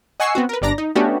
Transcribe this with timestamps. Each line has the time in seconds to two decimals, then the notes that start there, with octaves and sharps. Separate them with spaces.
0.20 D#5 F#5 G#5 C#6 E6 C7
0.35 B3 C4 F#4
0.49 A#4 B4
0.62 G1 G2 D4 D5 A#5 A#6
0.78 D#4
0.95 A3 B3 C#4 D4 F#4 G4